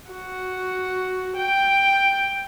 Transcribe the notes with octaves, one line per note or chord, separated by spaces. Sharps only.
F#4
G5